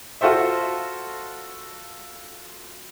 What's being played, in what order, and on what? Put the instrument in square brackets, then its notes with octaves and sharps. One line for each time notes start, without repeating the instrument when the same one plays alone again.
[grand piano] F4 F#4 A4 C5 E5